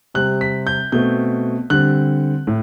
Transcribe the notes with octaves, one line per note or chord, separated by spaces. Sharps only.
C3 G3 C4 F#6
B6
G6
B2 A3 C4 G6
D3 G3 C4 F#6
A2